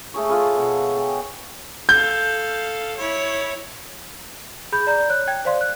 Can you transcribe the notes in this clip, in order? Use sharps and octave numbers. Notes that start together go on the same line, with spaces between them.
A3 G#4 C#5
F4 G#4 A4 B4
B2 F#5 C#6
G5 G#5
A4 F5 G6
E4 C#5
G#4 B5 G6
D5 A#5 G6
C#5 F#6
G5 G#6
C5 D5 F5 C6
F#6